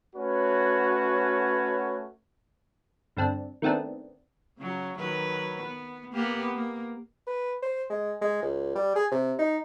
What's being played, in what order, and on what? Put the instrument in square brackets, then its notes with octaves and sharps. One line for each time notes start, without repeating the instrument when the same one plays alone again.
[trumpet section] A3 C#4 F#4 B4 C#5
[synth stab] G2 D3 C4 D4
D#3 A3 B3 C4 D4
[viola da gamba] C#3 F#3
D#3 F#3 B4
B3
A#3 B3 G4
A#3
[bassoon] B4
C5
G#3
G#3
C#2
G3
G#4
C3
D#4